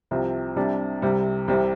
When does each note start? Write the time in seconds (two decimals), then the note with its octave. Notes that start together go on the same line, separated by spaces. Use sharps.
0.11 C2 C3 F3 C4
0.56 C2 C3 G3 D4
1.02 C2 C3 G3 C4
1.48 C2 C3 G3 C4